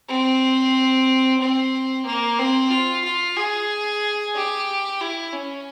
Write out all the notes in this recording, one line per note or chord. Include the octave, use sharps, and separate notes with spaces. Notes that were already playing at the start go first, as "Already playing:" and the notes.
C4
C4
A#3
C4
F4
F4
G#4
G4
E4
C#4